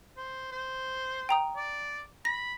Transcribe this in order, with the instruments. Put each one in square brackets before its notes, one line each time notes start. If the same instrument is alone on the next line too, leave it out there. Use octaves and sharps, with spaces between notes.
[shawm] C5
C5
[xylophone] G5 A#5 D#6
[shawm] D5
[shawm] B5 [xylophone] A#6